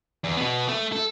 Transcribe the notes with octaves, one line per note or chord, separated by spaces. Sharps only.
E2
B2 B3
A3
A4